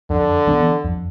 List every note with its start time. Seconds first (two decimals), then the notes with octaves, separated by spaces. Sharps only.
0.10 F2 D3
0.47 E3 B3 D4
0.85 F2